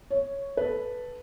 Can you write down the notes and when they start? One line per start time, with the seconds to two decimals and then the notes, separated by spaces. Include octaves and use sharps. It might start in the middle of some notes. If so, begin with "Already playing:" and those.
0.10 C#5
0.57 A4 B4